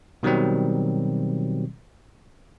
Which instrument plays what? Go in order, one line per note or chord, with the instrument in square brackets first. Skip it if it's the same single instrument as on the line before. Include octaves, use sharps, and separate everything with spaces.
[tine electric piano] B2 D#3 F#3 G3 C4